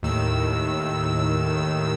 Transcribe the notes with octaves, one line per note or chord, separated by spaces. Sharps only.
D#2 A2 D#3 E6